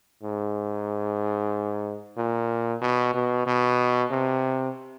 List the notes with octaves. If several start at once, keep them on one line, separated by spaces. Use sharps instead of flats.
G#2
A#2
B2
B2
B2
C3